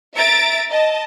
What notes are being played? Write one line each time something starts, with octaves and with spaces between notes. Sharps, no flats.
E5 A#5 A6 D7
D#5 A5